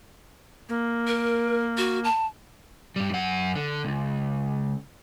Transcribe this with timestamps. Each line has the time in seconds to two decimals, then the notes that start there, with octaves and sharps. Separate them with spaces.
0.69 A#3
1.07 A#4
1.77 F#4
2.04 A5
2.96 G2 G3
3.11 F#2 F#5
3.56 D3
3.85 C#2